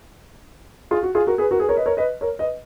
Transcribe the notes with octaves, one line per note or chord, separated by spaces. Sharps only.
F4 G#4
F#4
F4 G#4
F#4 A#4
G#4 B4
F#4 A#4
G#4 B4
A#4 C#5
B4 D#5
A#4 C#5
B4 D#5
A#4 C#5
B4 D#5